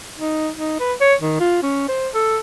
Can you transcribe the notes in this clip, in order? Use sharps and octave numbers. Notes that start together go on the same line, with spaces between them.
D#4
D#4
B4
C#5
D#3
F4
C#4
C5
A4